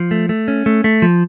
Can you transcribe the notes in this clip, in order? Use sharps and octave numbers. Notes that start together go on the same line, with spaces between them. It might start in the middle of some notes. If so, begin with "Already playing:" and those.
Already playing: F3
A3
A3
C#4
A3
A3
F3